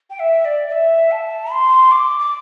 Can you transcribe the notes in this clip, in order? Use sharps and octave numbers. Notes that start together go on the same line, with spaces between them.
G5
E5
D5
D5
E5
A5
C6
D6
D6